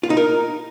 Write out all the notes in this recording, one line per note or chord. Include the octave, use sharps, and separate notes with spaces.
F4
D#4
A#4